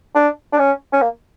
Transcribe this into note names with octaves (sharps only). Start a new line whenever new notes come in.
D4
D4
C#4
C#4
A#3